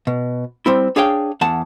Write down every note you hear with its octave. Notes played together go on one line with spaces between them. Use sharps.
B2
G3 C4 E4
D4 G#4 C#5 F5 G5
E2 F#5 A5